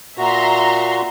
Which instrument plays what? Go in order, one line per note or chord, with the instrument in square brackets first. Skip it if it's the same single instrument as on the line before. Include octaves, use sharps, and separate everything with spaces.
[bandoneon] A#2 F#4 [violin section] E5 A#5 C6